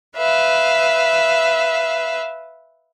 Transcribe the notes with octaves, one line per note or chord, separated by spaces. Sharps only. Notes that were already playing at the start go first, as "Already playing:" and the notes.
B4 E5 F5